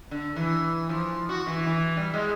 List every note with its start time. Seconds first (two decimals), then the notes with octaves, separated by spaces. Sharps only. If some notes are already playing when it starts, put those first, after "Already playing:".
0.11 D3
0.36 E3
0.89 F3
1.29 F#4
1.47 E3
1.66 E3
1.97 G3
2.14 G#3